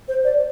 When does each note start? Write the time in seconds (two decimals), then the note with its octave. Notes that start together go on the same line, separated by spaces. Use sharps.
0.08 C5
0.24 D5